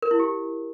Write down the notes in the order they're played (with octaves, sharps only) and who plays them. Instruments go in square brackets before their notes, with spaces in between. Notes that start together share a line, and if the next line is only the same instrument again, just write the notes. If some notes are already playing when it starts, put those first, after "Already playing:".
[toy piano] A#4
E4
G4